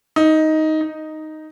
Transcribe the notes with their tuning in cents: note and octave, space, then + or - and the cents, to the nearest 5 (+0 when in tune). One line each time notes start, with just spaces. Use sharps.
D#4 +10
D#4 +0